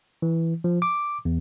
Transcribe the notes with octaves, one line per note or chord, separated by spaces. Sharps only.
E3
F3
D6
E2